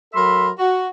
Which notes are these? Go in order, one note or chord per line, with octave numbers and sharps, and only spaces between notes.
F#3 A4 A#4 E5 B5 C6
F#4